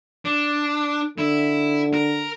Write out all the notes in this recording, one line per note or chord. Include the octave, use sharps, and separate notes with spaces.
D4
D3 E4
A#4